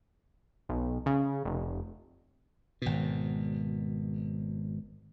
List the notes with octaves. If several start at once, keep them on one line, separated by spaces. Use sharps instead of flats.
B1
C#3
F1
G#1 B2